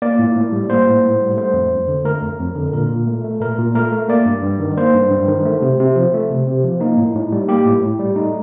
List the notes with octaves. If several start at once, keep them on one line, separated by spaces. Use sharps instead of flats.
A#3 D5
A2
A2
G3
A#3 C5
A2
A2
G3
A3 C5
F2
F2
D3
A3 A#4
F2
F2
D3
A#2 A#4
A#2
A3
A3
A#2 A#4
A#2
A3 A#4
A3
A#3 D5
G2
G2
D#3
A#3 C5
G2
G2
D#3
A3
C3
C3
F3
A3
C3
C3
F3
A#3 D#4
A2
A2
G3
A#3 G4
A2
A2
G3
A3 D#4